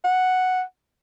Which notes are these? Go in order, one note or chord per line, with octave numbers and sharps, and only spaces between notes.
F#5